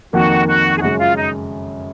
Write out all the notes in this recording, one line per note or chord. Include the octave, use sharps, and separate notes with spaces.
F2 D#3 A#3 F#4
F#4
G#4
F#2 C#3 G#3 F#4
F4
D#4